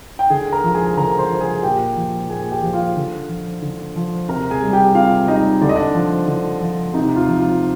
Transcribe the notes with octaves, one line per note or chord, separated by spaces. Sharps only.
G5
D3 G#4 G#5
A#4 A#5
F3
G#4 G#5
D3 A#4 A#5
C5 C6
F3
G#4 G#5
A#2 G4 G5
F3
A#2 G#4 G#5
G4 G5
F3
F4 F5
D3
F3
D3
F3
C3 A#4 A#5
G#4 G#5
G3
G4 G5
C3 F4 F5
G3 D#4 D#5
D3 D5
D#5
D4 D5
F3
D3
F3
C3 D#4
F4
F3
F4